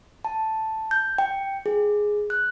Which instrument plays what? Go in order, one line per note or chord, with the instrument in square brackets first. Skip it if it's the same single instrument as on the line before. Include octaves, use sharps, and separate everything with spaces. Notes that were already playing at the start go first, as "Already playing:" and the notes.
[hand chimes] A5
G6
G5
G#4
F#6